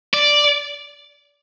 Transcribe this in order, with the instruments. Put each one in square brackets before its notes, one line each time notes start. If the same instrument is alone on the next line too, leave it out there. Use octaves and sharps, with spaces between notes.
[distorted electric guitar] D5